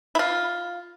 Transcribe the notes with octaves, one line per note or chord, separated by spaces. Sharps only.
E4
F4